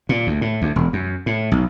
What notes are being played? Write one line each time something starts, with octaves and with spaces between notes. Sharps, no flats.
A#2
D2
A2
D2
E1
F#2
A2
B1